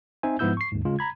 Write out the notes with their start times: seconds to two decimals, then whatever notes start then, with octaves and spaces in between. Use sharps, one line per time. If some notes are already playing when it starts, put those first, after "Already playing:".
0.23 C4 D#4 C5 E5 G#5
0.39 G#2 F3 B3 E4 E6 G6
0.57 C#6 C7
0.72 D#2 G#2
0.85 C#3 G#3 F4
0.99 A#5 B5 G#6